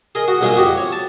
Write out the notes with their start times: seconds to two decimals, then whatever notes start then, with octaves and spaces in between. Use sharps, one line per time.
0.15 G#4 A#4 D#5
0.28 F#4
0.41 B1 A#2 G#3 G#4 A#4
0.56 F2 F#4 G4
0.77 C#5
0.92 A5